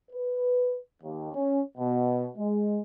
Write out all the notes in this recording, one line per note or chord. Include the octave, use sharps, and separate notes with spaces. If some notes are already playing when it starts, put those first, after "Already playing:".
B4
D#2
C#4
B2
G#3